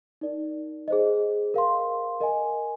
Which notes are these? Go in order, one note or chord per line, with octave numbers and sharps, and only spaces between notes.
D#4 A#4 D5
G#4 C5 D#5
A#4 F5 C6
A#4 D#5 G#5